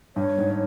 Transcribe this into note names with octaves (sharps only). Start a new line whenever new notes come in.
G2 C#5
G#2